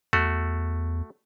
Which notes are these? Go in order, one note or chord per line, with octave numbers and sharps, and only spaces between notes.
E2 A3 F#4